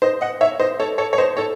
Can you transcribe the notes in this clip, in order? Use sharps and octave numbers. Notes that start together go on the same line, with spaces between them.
C5 D#5
D#5 F#5
C#5 E5
C5 D#5
A4 C#5
A4 C#5
C#5
C5 D#5
A4 C#5